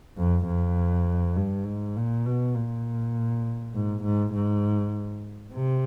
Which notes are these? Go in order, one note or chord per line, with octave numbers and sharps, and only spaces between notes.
F2
F2
G2
G#2
A#2
B2
A#2
G#2
G#2
G#2
C3